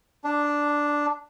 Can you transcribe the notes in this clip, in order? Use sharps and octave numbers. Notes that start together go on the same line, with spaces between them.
D4